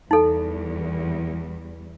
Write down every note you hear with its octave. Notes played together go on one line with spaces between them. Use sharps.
E2 G3 D#4 A4